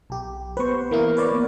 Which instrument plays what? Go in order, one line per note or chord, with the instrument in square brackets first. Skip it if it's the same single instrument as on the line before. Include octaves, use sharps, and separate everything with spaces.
[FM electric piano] B1 G4
[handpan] B3 C5 [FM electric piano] B4 C#6
[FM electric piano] E3 A#3 E4 [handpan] A#4
[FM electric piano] B4 C#5 D5
[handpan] A#3 B3